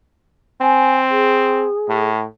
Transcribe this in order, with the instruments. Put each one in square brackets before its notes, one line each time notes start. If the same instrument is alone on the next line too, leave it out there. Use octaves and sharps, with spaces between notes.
[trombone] C4 [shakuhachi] G#5
[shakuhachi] G#4
[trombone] A2